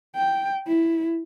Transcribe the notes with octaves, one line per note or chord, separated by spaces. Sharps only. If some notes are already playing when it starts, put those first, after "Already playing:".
G5
E4